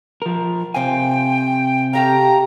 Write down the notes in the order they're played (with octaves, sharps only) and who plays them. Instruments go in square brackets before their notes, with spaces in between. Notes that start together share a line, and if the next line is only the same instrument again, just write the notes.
[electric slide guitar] F3 A#4
[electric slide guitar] C3 G#5 [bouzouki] F4 C5 [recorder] G5
[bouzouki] A3 G4 F5 [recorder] A#5